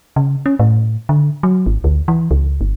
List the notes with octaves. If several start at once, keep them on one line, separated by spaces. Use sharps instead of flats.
C#3
C#4
A2
D3
F#3
G#1
D2
E3
C#2
G1